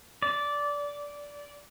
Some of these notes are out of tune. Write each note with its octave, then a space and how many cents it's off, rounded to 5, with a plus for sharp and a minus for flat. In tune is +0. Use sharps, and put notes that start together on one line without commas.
D5 -15